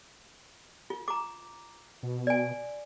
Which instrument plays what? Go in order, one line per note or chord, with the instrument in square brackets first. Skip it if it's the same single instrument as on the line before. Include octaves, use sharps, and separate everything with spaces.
[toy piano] F4
A#5 D6
[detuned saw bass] B2
[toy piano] D5 G#5